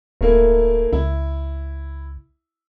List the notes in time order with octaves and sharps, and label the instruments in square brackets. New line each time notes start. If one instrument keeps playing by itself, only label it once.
[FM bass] D1 [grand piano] A3 A#3 E4
[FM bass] C#2 [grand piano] E4